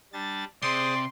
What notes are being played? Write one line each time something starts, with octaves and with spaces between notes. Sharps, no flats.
G3 D4 A6
C3 G#4 C5 D5 C6 D#6